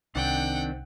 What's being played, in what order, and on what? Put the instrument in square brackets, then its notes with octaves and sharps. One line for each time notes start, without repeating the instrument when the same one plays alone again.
[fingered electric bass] C2 [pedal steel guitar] D#3 C4 D4 [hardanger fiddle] F#5 G5